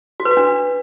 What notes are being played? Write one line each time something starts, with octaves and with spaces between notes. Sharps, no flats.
F#4
B4
F#4
D4